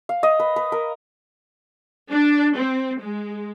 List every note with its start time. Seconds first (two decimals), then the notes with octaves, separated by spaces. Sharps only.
0.09 F5
0.23 D#5
0.40 B4
0.56 B4
0.72 A#4
2.11 D4
2.55 C4
3.00 G#3